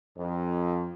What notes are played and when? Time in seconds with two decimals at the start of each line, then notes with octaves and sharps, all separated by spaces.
0.16 F2